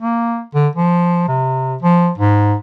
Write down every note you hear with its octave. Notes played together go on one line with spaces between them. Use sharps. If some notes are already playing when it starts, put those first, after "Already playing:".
A#3
D3
F3
C3
F3
G#2